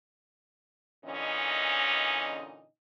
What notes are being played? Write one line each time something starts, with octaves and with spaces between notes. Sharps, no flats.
A#2 D3 E3 C#4 D#4 D#5